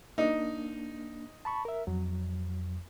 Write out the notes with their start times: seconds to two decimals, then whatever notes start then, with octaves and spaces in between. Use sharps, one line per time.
0.18 A#3 D4 D#4
1.45 A5 B5 C#6
1.65 A#4 E5
1.87 F2 F#3